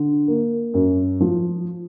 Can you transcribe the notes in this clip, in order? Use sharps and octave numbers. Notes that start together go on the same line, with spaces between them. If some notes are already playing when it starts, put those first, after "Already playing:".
Already playing: D3
A#3
F#2
F3